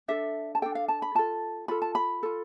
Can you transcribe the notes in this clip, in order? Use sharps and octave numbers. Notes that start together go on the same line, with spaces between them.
D4 A4 E5
A5
D4 A4 G5
F5
A5
B5
F4 A4 A5
F4 A4 B5
A5
B5
F4 A4